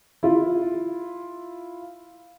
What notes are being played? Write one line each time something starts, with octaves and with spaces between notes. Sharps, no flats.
E4 F4